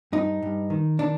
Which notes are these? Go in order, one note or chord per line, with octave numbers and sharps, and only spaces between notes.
G2 D#4
G2
D#3
D#3 D4